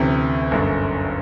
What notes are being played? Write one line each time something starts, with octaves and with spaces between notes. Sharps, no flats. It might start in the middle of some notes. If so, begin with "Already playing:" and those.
Already playing: D2 C3 E3 C#4
G1 F#2 D3